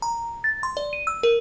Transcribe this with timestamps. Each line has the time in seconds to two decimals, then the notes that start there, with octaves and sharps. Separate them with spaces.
0.02 A#5
0.44 A6
0.63 C6
0.77 D5
0.93 D#7
1.07 E6
1.23 A#4